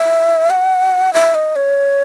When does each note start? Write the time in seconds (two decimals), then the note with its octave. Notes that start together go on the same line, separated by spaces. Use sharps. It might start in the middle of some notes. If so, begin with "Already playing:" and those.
Already playing: E5
0.50 F#5
1.14 E5
1.35 D#5
1.56 C#5